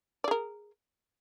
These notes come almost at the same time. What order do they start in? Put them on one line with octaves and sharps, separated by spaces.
D5 G#4 A#4